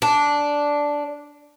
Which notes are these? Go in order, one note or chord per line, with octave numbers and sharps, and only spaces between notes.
D4